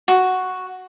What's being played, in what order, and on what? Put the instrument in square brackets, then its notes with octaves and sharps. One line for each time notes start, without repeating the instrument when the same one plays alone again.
[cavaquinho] F#4